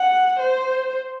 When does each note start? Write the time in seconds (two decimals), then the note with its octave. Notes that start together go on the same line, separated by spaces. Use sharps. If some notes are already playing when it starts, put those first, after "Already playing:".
Already playing: F#5
0.40 C5